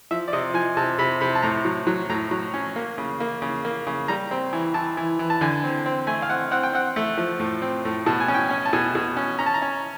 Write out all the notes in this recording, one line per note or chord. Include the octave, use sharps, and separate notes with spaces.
F3 E5
D5
C3 D#5
F3 G#5
C3 A5
C3 B5
C3 B5
A5
A2 A#5
F#3
F#3
A2 A#5
F#3
C#4
A#3
C#3
A#3
C#3
A#3
C#3
G3 A#5
C4
E3
E3 A5
E3
E3
A5
D3 G#5
C4
C4
A3 G#5
F5
C4 F#5
C4 F#5
G5
C4 F#5
A3
F3
A2
C4
A2
B2 A5
G#5
C#4
G5
G#5
C#4
A5
B2 G#5
B2
C#4
C#4 A#5
A5
A#5
C#4